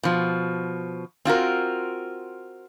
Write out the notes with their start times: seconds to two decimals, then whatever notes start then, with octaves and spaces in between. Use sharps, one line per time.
0.03 B2 F3
1.25 C4 F4 F#4 A#4